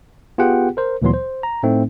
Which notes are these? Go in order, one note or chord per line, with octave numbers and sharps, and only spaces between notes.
B3 F4 G4 G#4 F#5 G5
A#4 C5
D2 A#2 E3 F#3 B3 C6
C5
A#5
A2 A3 C4 D#4